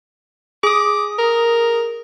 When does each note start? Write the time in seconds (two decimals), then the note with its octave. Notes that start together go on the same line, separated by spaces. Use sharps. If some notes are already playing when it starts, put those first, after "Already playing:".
0.63 G#4 D6 D#6
1.19 A#4